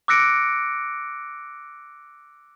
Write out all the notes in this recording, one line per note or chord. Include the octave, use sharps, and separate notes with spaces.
D6 E6 F#6 A#6 C#7 D7